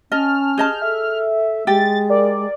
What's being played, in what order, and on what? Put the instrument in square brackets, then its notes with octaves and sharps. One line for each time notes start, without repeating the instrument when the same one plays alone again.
[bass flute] C#4 [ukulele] D#5 [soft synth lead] A5 [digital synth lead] F6
[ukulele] G#4 D#5 A5 [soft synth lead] G6
[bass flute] A4 [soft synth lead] E5
[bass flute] G#3 [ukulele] G4 [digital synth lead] A6
[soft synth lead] A#4 [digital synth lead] D5